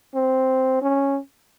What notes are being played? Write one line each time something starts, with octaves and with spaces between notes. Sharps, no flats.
C4
C#4